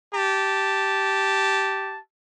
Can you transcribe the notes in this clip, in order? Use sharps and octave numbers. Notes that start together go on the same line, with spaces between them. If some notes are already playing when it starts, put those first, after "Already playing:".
G4 A5